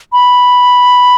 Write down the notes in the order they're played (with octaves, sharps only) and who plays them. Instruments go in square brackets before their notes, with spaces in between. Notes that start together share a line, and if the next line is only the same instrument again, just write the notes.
[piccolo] B5